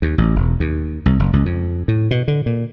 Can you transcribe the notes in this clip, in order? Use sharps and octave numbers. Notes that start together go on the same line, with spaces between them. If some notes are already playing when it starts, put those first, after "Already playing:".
D#2
A1
E1
D#2
C2
F#1
C#2
F2
A2
B2
D3
A#2